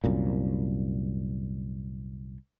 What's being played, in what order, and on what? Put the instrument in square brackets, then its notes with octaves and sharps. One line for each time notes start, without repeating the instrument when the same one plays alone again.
[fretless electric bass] C2 F#2 A#2